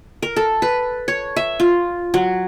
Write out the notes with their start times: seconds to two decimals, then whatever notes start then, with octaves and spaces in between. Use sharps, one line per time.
0.22 A#4
0.36 A4
0.62 B4
1.08 C#5
1.36 E5
1.60 F4
2.14 F#3